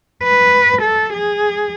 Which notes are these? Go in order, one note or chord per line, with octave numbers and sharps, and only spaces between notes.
B4
A4
G#4